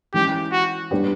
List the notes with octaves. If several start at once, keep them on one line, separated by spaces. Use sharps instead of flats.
E3 G#3 C#4 E4 G4
F#4
G3 B3 D4 G4 B4